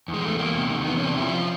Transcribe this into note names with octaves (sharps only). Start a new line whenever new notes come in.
E2
G#3
E2 A3
E2 A#3
C3
D#3
E2 B3
C#4
C3
D4
F3 E4
F4